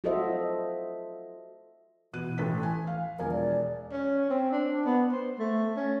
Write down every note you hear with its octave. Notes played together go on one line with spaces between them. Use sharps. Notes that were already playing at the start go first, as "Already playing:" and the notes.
F4 F#4 A4 C5 D#5 E5
B2 E3 F#6 D#7
A1 A4 B6
G#5
F5
E1 F3 A#4 G#5
D5
C#4
C4
D4
B3
C5
A3
C#4